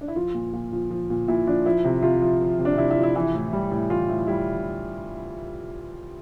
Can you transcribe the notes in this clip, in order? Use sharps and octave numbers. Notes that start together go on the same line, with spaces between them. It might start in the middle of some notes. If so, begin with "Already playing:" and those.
D4
E4
F3 F4
A#2
A#2
F3
F3
A#2
A#2 E4
F3 D4
F3 E4
C3
C3 F4
F3
F3
C3
D4
C3 E4
E4
F3
E4
E3 E4
A2
G3
A2
E3 F4
A2
G3 E4